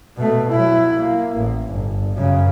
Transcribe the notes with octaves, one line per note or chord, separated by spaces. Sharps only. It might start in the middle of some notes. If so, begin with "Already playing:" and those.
B2 A3
F#3 E4
A#3
A1
G1
F#2 C#3